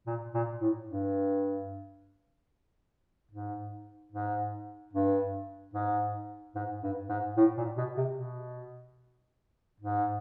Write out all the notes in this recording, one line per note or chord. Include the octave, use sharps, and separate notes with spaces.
A#2
A#2
A2
G2
G#2
G#2
G2
G#2
G#2
G2
G#2
A2
A#2
B2
C3
B2
G#2